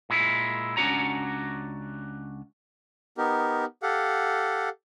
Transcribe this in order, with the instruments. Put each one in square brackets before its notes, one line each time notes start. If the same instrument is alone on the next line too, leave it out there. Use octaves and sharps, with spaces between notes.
[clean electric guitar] A#2 G#3 E4
C#2 C#4 D4 F#4 C#5 A#5
[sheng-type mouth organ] B3 D#4 G4 A#4
G4 A4 F5 F#5